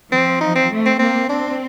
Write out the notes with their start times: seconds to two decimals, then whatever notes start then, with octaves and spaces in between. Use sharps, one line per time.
0.11 F3 C4
0.41 D#4
0.55 C4
0.71 A3
0.86 C4
0.99 A#3 C4
1.29 C4 D4